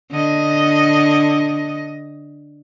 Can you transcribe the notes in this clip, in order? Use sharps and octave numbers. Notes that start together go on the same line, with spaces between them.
D3 D#5